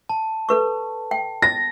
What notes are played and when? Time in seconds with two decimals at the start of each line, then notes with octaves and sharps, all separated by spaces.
0.09 A5
0.49 A4 B4 C#6
1.11 G5
1.42 A6 A#6